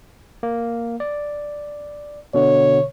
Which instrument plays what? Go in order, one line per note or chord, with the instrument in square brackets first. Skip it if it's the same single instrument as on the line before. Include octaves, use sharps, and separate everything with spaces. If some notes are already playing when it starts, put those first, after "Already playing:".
[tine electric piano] A#3
D5
[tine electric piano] B2 D3 [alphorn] C#5